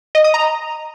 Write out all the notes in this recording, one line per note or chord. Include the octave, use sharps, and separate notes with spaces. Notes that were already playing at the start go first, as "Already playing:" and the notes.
D#5
D#6
A#5